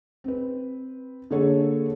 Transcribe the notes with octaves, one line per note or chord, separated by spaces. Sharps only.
C4 B4
D3 A#3 G#4 A4 C#5